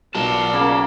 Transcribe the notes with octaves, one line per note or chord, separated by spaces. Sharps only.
B1 F4 F#4 A#4 D5 A5
C#3 A#3